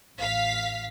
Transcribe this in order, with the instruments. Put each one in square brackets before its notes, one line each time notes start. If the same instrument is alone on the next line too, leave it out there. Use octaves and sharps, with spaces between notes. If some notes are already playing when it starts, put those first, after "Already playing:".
[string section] A1 F5 B6